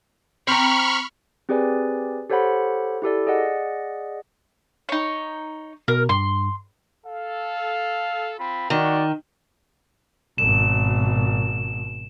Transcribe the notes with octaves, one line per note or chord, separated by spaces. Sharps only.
C4 A#5 B5 C#6 F6
C4 G4 G#4 B4 D5 G#5
G4 A4 C5 C#5 F#5 B5
E4 G4 A4 D5
G#4 D5 D#5 F#5
D#4 C#5
B2 A#4
G2 C6
A4 F5
C4 F4 B5
D#3 F#4 D5
G#1 B2 E7